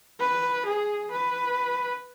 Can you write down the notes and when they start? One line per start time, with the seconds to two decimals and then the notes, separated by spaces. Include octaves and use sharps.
0.20 B4
0.66 G#4
1.11 B4